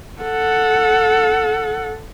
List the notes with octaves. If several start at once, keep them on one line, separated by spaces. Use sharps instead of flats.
A4 F#5